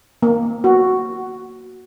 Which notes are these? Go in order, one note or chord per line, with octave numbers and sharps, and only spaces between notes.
A#3
F#4